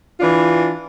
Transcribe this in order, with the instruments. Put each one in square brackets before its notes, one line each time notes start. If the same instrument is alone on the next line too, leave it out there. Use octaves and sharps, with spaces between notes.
[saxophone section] E3 D4 F4